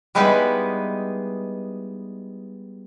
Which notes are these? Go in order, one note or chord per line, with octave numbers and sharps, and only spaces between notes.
G3 G#3 B3 D#4 E4 B4